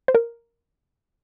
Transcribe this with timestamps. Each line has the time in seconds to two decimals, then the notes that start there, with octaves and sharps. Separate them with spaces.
0.08 C5
0.15 A#4